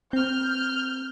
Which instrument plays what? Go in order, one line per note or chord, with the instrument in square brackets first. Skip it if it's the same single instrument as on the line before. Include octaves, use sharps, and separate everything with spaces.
[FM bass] C4 [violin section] F6 G6